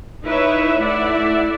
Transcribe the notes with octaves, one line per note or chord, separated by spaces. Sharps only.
D#4 E4 B4 C#5 E5
A3 E4 D5 E5 F#5